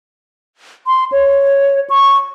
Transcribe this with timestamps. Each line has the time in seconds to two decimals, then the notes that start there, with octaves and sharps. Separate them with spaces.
0.87 C6
1.12 C#5
1.90 C#6